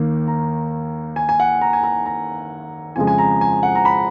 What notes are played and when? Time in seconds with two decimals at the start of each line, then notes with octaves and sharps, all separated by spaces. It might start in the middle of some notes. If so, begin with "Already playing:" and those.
Already playing: D#2 D#3 A#3
0.28 A#5
1.16 G#5
1.29 G#5
1.40 F#5
1.61 A#5
1.73 G#5
1.83 A#5
2.06 A#5
2.96 F2 C#3 F3 G#3 G#5
3.07 G#5
3.18 A#5
3.41 G#5
3.63 F#5
3.75 A#5
3.85 B5